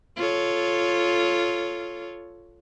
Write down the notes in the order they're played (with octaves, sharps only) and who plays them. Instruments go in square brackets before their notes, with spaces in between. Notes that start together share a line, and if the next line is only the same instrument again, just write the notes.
[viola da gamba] F4 A4 C#5